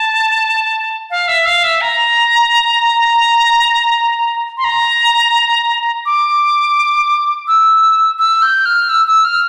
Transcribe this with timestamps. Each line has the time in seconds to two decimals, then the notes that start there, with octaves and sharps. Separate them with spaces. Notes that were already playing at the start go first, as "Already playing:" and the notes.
Already playing: A5
1.10 F5
1.28 E5
1.45 F5
1.63 E5
1.81 A#5
4.57 C6
4.64 A#5
6.06 D6
7.47 E6
8.18 E6
8.42 G6
8.65 F6
8.89 E6
9.07 E6
9.24 F6